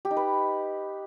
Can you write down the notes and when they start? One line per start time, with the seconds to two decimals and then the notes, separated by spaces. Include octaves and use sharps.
0.05 G4
0.11 D#4
0.17 B4